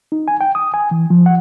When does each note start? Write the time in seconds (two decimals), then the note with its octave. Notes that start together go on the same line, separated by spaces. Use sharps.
0.12 D#4
0.28 G#5
0.41 G5
0.55 D#6
0.74 G#5
0.91 E3
1.10 F3
1.26 F#5